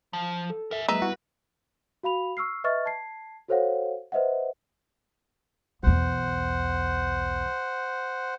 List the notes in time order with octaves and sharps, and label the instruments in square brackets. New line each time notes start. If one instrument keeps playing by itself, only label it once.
[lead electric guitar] F3
[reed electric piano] A4
[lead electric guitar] A#4 E5
[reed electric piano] F#3 G#3 A#3 [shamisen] D#4 [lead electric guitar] B4 [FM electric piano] E5
[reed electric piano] G3 B3 E4 [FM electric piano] F#4
[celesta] F#4 F5 B5 F7
C#6 E6 F6 C7
B4 D#5 E5 C#6 F6 A6
A5 G#6 C7
F#4 A4 C5 C#5 F5 F#5
B4 C5 D#5 E5 F#5
[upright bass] B1 E2 [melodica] C5 F#5